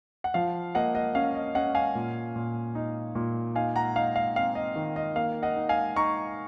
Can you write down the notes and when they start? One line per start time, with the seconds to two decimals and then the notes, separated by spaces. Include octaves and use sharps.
0.24 F#5
0.34 F3 F5
0.75 A#3 D#5 F#5
0.95 D#5 F#5
1.15 C#4 F5
1.35 D#5
1.55 C#4 D#5 F#5
1.75 F5 G#5
1.95 A#2
2.36 A#2
2.75 D#4
3.15 A#2
3.55 D#4 F5 G#5
3.76 F#5 A#5
3.96 D#4 F5
4.16 F5
4.36 C4 F5
4.55 D#5
4.76 D#3
4.96 D#5
5.16 A#3 F5
5.43 D#5 F#5
5.56 D#4
5.69 F5 G#5
5.96 D#4 A#5 C#6